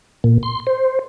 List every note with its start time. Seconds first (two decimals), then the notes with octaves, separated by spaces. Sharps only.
0.24 A#2
0.43 C6
0.67 C5